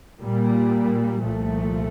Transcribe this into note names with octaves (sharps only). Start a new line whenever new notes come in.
A#2 G3 A#3
C2 A#2 F3 A3